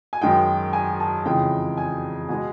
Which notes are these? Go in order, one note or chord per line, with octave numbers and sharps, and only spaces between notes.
G#5
F#2 D#3 G#3 G5
G#5
A5
F2 C#3 E3 G#3 G5
G#5
B2 G#3 G#5